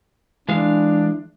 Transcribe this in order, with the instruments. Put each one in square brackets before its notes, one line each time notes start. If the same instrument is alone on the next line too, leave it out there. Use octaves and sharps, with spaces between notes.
[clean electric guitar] E3 G#3 F5 [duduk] D4